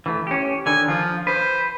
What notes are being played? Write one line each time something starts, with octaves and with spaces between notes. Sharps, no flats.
E3 A3
C#4 G4
D3 D#3 G#5
F3 F4
B4 C5